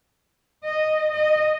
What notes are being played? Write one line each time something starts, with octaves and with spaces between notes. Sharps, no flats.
D#5
D#5